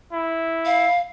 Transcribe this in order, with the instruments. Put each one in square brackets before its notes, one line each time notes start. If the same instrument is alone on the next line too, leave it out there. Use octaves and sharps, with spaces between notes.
[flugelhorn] E4
[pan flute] F5